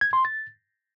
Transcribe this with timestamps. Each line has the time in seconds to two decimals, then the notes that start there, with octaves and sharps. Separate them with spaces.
0.01 G#6
0.13 C6
0.25 A6